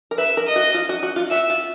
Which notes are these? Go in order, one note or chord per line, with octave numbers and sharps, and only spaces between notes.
A#4
B4 E5
A#4
D#5
F#4
F4
F#4
F#4
F4
F#4 E5
F4